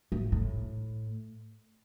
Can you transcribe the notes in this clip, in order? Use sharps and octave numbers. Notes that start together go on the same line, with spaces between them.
A2
A2